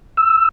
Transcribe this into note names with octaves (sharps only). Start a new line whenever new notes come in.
E6